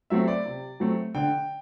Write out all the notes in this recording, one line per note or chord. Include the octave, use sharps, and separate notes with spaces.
F#3 A3 C4 E5
D5
C3
F#3 A3 C4
D3 G5